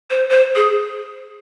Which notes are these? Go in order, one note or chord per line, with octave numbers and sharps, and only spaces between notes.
C5
C5
G#4